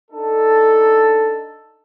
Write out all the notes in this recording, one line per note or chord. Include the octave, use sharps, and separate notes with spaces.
D4 D#4 A4